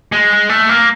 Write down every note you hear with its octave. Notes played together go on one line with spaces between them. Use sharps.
G#3
A3
A#3